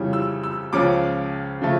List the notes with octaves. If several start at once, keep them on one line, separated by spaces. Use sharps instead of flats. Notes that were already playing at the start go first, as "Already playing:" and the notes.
Already playing: F2 C#3 E3 G3 C#4
E6
E6
C#2 C#3 F3 C#4 D6
C#3 F3 A3